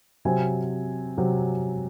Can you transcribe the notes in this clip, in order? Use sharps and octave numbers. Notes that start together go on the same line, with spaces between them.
C3 F#3 C4 G#5
C3 F#3 C4